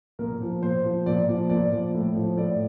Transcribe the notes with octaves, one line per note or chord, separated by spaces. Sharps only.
A#2 A#4
F3
A#2 C5
F3
A#2 D5
F3
A#2 D5
F3
A2
F3
A2 D5